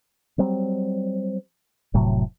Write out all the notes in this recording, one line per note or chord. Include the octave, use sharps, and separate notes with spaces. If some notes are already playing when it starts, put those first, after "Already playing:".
F#3 G3 C4
F1 A2 C3 F#3